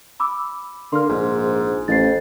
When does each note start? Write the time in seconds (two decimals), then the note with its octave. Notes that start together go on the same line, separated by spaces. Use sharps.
0.20 B5 D6 E6
0.92 D3 A#3 C6 F6
1.09 A#1 G#2
1.88 A1 F2 A6 C7